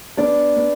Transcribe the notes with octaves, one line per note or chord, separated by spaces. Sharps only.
B3 D4 D5
B3